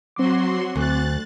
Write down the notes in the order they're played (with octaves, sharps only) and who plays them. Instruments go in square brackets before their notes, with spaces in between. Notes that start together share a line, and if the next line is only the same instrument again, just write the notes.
[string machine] F#3 F#4 C6 [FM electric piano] C4 D6
[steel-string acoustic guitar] D2 [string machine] F#6 A6